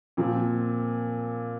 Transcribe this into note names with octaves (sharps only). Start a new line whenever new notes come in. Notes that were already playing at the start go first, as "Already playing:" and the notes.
A#2 F3 C4